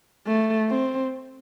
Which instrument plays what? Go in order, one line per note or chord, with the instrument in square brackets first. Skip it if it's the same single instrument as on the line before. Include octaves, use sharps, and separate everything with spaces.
[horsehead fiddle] A3
C4